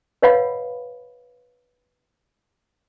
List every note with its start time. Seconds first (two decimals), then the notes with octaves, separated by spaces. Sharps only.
0.22 B4 C#5 D#5 F5 F#5 B5